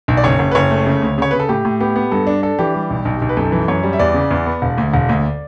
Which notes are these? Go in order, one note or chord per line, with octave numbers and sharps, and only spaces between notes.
B1
D5
F#1 C#5
F#1
B4
F#1 C#5
A3
C#3
D2
C#3 C#5
C#3 B4
A4
A2 G4
A2
B3 G4
B3
G2 A4
D4
D4 A4
E3 G4
G3
B1
B1
B1
B4
F#2 A4
E3
F#2 C#5
G3
E5
E2 D5
C#3
E2
B3
E1
D2
E1
D2